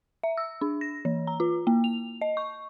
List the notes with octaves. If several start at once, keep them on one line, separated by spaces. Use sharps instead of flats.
E5
E6
D4
A#6
E3
A#5
F4
A#3
F7
D#5
C#6